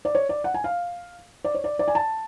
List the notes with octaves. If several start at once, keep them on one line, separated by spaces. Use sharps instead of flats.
D5
C#5
D5
F#5
G#5
F5
D5
C#5
D5
D5
G#5
A5